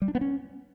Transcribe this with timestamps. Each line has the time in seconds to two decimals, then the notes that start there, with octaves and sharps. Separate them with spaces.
0.02 G3
0.08 D4
0.15 B3
0.21 C#4